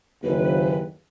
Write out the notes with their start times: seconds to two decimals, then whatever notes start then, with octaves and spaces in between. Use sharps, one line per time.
0.23 F#1 D#2 B4